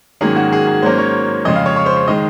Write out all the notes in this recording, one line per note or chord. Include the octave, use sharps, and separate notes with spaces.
G#2 D#3 F#3 A#3 C#4 G#4
F#4
G#4
G#4
G#2 F#3 A#3 C#4 C5
C#5
F2 C#3 G#3 C#4 D#5
F5
C#5
C#5
C5
C5
D#3 G#3 D#5